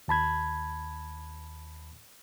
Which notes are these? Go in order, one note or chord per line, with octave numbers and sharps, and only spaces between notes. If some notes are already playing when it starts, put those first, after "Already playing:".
D#2 A5 B5 G#6